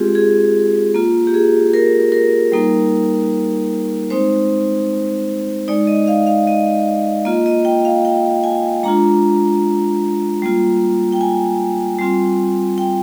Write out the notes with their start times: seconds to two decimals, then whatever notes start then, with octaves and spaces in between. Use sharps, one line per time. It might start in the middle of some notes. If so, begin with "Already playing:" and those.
Already playing: G#3 C4 F4 G4 G#4
0.15 G#4
0.95 A#3 F4
1.27 G4
1.34 G#4
1.73 A#4
2.12 A#4
2.52 G3 A#3 D#4
4.10 G#3 C4 D#4 C5
5.68 G#3 D#4 D5
5.87 D#5
6.08 F5
6.26 F5
6.47 D#5
7.25 A#3 F4 D#5
7.46 D#5
7.65 G5
7.85 F5
8.05 G5
8.44 G#5
8.83 G#3 D4 F4 A#5
10.42 G3 A#3 F4
11.12 G5
11.21 G#5
11.99 G3 C4 F4
12.78 G5